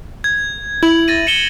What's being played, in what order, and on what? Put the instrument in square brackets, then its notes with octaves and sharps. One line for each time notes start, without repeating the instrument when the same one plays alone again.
[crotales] G#6
[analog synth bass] E4 [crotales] F#7
[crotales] A6 A#6 D#7
C#7 E7 G7